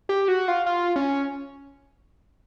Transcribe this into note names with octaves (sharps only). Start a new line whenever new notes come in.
G4
F#4
F4
F4
C#4